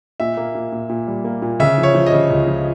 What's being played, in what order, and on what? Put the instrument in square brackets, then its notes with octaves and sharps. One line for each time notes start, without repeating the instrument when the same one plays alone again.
[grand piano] A#2 E5
A#3
A#2
A#2
A#2
G3
A#3
A#2
C#3 E5
F3
C#5
F3
D#5
C#3
C#2
F3